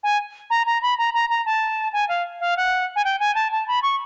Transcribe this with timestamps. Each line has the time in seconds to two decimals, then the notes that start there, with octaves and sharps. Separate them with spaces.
0.03 G#5
0.50 A#5
0.67 A#5
0.82 B5
0.98 A#5
1.14 A#5
1.30 A#5
1.46 A5
1.93 G#5
2.09 F5
2.40 F5
2.57 F#5
2.96 G#5
3.05 G5
3.20 G#5
3.35 A5
3.52 A5
3.68 B5
3.83 C#6